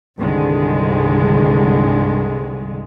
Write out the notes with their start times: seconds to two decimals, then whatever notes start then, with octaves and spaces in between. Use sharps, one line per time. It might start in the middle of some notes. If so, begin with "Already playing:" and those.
0.18 C2 G2 D3 D#3 G#3